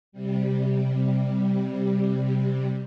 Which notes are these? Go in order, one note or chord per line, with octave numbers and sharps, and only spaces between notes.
C3 G3